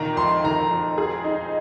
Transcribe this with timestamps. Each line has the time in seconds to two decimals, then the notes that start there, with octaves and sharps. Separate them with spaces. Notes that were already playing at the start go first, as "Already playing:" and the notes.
Already playing: A#2 D#3 A#5
0.17 F2 C6
0.44 D#3 A#5
0.71 F2
0.98 G#4
1.24 D#4